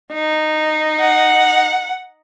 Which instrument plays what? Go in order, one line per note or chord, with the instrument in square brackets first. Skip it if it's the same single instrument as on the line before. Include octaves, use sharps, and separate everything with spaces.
[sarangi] D#4
[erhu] F#5